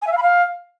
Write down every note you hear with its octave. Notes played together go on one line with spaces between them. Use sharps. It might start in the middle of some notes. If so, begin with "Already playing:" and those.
G#5
E5
F5
B5
F5